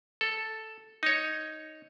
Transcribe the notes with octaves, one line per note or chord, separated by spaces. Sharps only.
A4
D#4 C#5